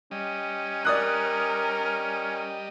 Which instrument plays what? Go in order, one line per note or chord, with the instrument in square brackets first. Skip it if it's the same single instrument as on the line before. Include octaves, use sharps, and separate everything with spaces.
[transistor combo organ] G3 D#5 [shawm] C#4
[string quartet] A#4 F6 [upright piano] D5 D#6 F#6